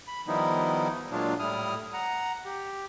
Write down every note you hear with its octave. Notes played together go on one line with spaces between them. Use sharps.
B5
D#3 F3 G3 B3 D#4 E4
A#2 F#3 G#3 D4 F4
A2 G3 E4 D#6 F6
F#5 A#5
G4